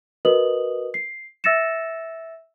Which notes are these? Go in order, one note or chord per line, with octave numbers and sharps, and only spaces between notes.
F#4 A#4 B4 D#5 D#6 F#7
C7
E5 E6 A6 A#6 C#7 E7